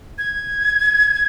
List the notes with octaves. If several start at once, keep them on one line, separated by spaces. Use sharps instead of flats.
G#6